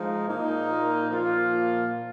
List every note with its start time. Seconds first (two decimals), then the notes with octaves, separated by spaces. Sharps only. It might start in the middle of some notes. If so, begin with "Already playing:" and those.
Already playing: F3 G#3 D#4
0.27 A#2 A#3 D#4
0.67 F4 A#4
1.09 A#2 F3 A#3 F4